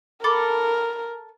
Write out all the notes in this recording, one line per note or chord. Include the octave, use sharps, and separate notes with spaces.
A4 A#4 B5 D6